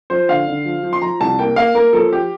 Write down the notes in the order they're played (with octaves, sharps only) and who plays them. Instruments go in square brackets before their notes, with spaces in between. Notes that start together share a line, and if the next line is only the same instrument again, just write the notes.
[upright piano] F3 C5
D3 F5
D3
F3
F3
C6
F3 A#5
C2 A5
A#3 G5
A#3 F5
A#3 A#4
F3 A4
G4